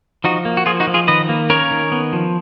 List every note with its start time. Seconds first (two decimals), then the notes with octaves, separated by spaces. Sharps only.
0.24 F3 D#4 F#4
0.45 A#3
0.57 F#4
0.66 F3 F4 G#4
0.80 D#4 F#4
0.87 F3
0.94 F4 G#4
1.08 D#3 B4 D#5
1.29 A#3
1.50 C#4 A#4 C#5
1.71 D#3
1.92 B3
2.13 F3